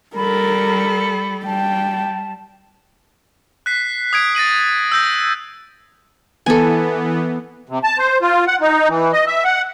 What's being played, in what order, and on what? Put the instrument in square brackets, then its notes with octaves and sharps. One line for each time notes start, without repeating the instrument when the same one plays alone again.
[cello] G3 A4 [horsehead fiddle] A#4 [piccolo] B5
[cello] G3 [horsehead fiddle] G5 [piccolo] A5
[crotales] F#6 B6 C7
D#6 G#6 D7
A6 A#6 D#7 F#7
E6 G6 A#6
[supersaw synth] E3 B3 [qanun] A4 G#5
[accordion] C3
A5
C5
F4
F#5
D#4
E3
D#5
E5
F#5